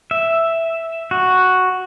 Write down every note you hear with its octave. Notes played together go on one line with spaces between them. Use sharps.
E5
F#4